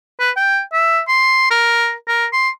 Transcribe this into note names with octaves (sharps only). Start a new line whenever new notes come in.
B4
G5
E5
C6
A#4
A#4
C6